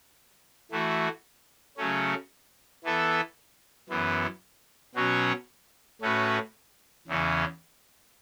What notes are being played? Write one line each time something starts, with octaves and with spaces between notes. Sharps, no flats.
E3 A3 F#4
C#3 F#3 A3 C#4
E3 B3 A4 E5
F#2 E3 B3
B2 F#3 C#4 F#4 C#5
A2 A3 C#4 F#4 B4
E2 C#3 E3 C#4